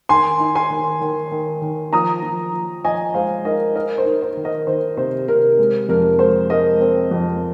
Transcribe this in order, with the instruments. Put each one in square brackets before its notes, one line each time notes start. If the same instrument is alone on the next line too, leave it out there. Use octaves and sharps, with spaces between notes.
[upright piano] D#3 G#5 C6
D#4
G#5 C6
D#3
D#3
D#3
D#3
F3 A#5 D#6
F3
F3
F3 D#5 G#5
G#3 C5 F5
D#4 A#4 D#5
D#4 A#4 D#5
C5
D#4
C5
D#3
A#4 D#5
D#3 C5
C3 C5
C3 A#4
G#3
F2 A#4
G#3 C5
G#3 A#4 D#5
C4
F2